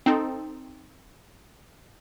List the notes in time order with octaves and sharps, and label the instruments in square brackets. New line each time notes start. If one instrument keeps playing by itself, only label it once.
[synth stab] C4 D#4 A4